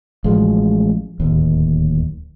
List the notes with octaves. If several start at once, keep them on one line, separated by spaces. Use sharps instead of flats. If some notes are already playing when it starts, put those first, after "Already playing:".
A1 F3 F#3 G#3
D1 D#2